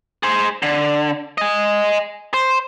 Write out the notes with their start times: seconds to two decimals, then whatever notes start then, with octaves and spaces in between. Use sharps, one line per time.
0.23 G#4 C5
0.63 D3
1.38 D#5 G#5
2.34 C5